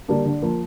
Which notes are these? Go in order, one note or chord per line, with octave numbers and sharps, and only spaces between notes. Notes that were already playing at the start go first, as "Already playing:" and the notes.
D3 G3 A#3 D4
D3
F3 A#3